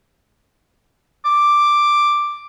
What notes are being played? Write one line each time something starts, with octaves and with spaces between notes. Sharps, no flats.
D6